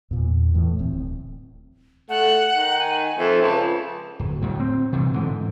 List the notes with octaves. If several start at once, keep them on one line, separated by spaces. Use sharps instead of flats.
E2 A#2
A2 E3
D1 C4
A3 F#5
D#3
G#5
F2 E5
C#2 A5
D1
D2 A2 G3
C4
C3 E3 G3
G#2 D3 E3